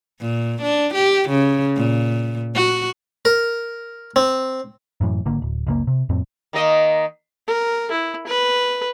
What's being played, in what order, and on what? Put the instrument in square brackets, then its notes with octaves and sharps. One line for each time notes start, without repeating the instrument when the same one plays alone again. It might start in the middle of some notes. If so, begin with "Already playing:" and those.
[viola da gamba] A#2
D4
G4
C#3
A#2
F#4
[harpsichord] A#4
C4
[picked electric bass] F#2 A2 C3 E3
G#1 D3 A#3
D1
F#1 C#2 A#3
C3
F2 A2 C4
[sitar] D#3 A#3 D#5
[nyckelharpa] A#4
E4
B4